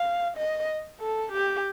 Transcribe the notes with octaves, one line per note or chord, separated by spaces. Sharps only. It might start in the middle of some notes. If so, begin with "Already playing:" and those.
Already playing: F5
D#5
A4
G4